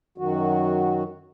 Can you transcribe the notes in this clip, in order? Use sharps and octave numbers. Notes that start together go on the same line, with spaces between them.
F#2 D#3 F#3 F#4